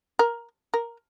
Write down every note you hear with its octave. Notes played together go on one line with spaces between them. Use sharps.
A#4
A#4